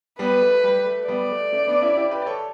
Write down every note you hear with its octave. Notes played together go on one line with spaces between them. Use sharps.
G3 B3 B4
A3
G3
A3
G3 B3 D5
A3
A3 C#4
B3 D4
C#4 E4
E4 G4
G4 B4
D5
A4 C#5